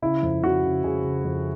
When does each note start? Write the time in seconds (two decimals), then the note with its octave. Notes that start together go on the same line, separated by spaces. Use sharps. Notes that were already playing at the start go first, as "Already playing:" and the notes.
0.02 C#3 E4
0.23 F2
0.43 C#3 F#4
0.64 C#3
0.83 C#3 G#4
1.04 C#3
1.25 F2